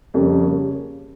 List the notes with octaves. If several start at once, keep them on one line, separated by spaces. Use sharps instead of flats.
F2 C#3 G3 A#3 C#4
C#3 G3 A#3 C#4